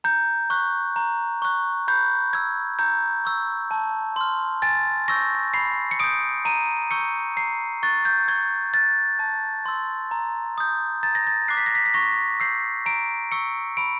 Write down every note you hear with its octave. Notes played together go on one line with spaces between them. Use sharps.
A#5 G6
C#6 F#6
A#5
C#6 F#6
B5 G6
E6 G6 G#6
A#5 G6
C#6 E6 G6
A5
C6 F6
G#5 A6
C#6 E6 G6 A#6
B5 C7
C#7
D#6 G6 D7
A#5 D#7
C#6 E6 G6 C#7
A#5 C7
C#6 F#6 A6
G6
C#6 G#6
F#6 A6
A5
C6 E6
A#5
D#6 G6
A#5 A6
A#6
A6
D6 F#6 C7
B6
A#6
B6
B6
C#6 A#6
E6 G6 C7
A#5 D7
C#6 E6 C#7
B5 D7